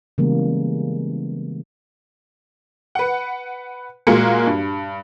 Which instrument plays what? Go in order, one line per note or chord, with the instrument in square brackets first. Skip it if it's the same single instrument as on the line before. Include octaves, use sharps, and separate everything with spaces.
[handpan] C#3 E3 G3 G#3 A#3 B3
[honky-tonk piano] B4 F#5
A#2 G#3 F4 F#4 A#4 C#7
G2